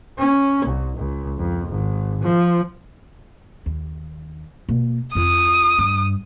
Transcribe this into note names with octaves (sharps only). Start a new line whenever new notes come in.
C#4
C2
C#2
F2
G#1
F3
D#2
B2 A#3
F2 F4 D#6
G2